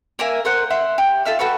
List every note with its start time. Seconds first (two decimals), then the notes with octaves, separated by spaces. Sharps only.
0.19 A#3 A#4 E5 G#5
0.45 A#4 C5 F#5
0.70 E5 F#5 C6
0.98 G4
1.25 F4 A4 E5 F6
1.39 F#4 A4 B4 C#6